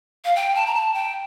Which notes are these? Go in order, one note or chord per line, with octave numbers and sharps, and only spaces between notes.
F5
G5
A5
A#5
A5
G5